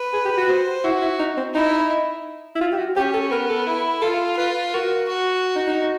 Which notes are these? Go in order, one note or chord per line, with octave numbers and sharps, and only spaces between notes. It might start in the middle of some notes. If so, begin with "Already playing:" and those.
Already playing: B4
G#4
G4
F#4
C5
E4 F#4
E4
D#4
C4
D#4 E4
E4
F4
G4
F#4
C#4 G4
A4
B3 A#4
A4
E4
F4 A4
F4 B4
F#4 A#4
F#4
D#4
D#4